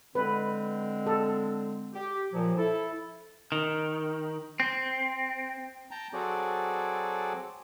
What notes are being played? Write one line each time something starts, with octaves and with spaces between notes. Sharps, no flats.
D3 G#3 C4 B4
A4
G4
A#2 F3 F#3
E4 A4
D#3
C4
G5 A5 A#5
F#3 C4 F#4 G#4 A4 D5